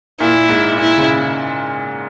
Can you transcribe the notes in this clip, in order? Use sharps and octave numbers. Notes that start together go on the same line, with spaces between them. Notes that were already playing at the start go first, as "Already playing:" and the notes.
A#2 E4
G#2
A#2 E4
C#3